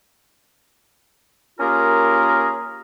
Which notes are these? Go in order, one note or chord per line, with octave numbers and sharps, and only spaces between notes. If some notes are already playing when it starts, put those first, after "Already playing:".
A#3 C#4 F4 G4 G#4 A#4